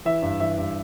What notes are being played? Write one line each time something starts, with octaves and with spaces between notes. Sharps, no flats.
E3 E5
G2
E3 E5
G2